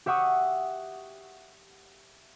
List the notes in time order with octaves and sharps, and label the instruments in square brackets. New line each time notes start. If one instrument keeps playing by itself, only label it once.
[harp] G4 E5 F#5 C#6 D#6